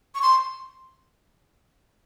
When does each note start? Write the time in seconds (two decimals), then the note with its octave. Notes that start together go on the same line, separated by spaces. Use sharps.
0.15 C#6
0.22 C6